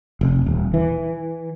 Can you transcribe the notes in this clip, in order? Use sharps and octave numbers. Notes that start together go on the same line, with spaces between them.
F1
D#1
E3